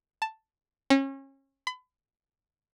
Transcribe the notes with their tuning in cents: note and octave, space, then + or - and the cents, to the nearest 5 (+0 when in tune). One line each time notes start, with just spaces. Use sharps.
A5 +5
C#4 -30
B5 +35